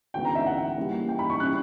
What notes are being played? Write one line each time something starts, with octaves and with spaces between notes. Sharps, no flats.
D2 C#3 E3 B3 G5
A#5
E5
F#5
C#3 E3 G3 A#3
G5
B5
C#6
C#3 G3 C#4 E4 F#6